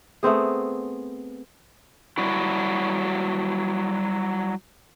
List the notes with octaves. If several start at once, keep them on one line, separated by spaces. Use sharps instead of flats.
A3 B3 C4 G#4
F#3 G3 E4 F#4